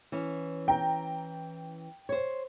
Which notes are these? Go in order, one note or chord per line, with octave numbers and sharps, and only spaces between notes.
E3 C#4
G5 A#5
C5 C#5